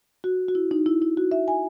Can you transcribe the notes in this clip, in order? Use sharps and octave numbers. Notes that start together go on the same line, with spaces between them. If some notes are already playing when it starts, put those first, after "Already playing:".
F#4
F#4
E4
D#4
E4
E4
F#4
E5
G#5